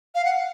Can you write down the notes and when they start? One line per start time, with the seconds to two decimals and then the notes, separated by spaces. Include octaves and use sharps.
0.15 F5
0.25 F#5